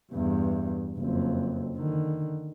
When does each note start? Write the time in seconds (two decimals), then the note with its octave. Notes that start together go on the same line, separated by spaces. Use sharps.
0.12 E2 G2
0.99 F#1 F2
1.76 D3 D#3